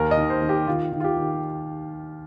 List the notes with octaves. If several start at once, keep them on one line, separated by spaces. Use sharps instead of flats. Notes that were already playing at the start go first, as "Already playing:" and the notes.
Already playing: D#2 A#4
D#5
D#3
C5
D#3
G4
D#3 F4
D#3
F4
G4
D#3